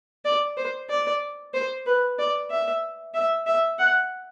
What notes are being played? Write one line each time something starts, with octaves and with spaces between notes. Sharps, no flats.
D5
C5
D5
C5
B4
D5
E5
E5
E5
F#5